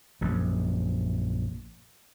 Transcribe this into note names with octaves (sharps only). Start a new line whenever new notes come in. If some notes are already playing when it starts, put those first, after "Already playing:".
A#1 F#2